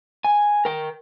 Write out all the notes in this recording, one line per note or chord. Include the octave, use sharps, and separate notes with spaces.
G#5
A#4 G5